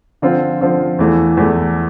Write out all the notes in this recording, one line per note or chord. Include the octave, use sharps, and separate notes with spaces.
D3 F3 C4 F4
D3 F3 C4 F4
E2 E3 A3
E2 E3 A3